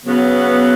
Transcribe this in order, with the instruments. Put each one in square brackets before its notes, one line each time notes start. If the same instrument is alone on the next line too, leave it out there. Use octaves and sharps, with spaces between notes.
[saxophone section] C#3 F#3 B3